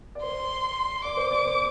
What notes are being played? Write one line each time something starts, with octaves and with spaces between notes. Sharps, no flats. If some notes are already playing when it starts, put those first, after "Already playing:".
D5
C5 C6
D5 D6
C5
D5
C5